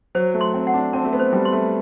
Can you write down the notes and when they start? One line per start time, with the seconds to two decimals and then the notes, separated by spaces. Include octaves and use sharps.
0.15 F#3 C5
0.34 A3
0.41 C6
0.54 C4
0.67 F#5
0.74 D4
0.93 C4 A5
1.05 A3
1.13 B3
1.19 C5
1.33 G3
1.45 C6
1.52 A3